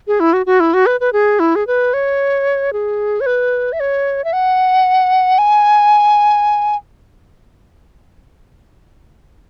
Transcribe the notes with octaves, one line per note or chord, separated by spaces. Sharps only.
G#4
E4
F#4
F#4
E4
F#4
B4
B4
G#4
E4
G#4
B4
C#5
G#4
C#5
B4
E5
C#5
E5
F#5
G#5